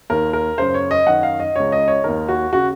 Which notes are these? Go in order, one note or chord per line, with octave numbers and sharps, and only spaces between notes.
D#2 D#3 A#4
A#4
F#2 C#3 C5
C#5
D#5
F#2 D#3 F#5
F5
D#5
C#2 C#3 C#5
D#5
C#5
D#2 D#3 A#4
F#4
C#3 F#4